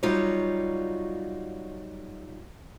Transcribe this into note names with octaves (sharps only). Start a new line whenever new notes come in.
F#3 G3 D#4 F4 F#4 C#5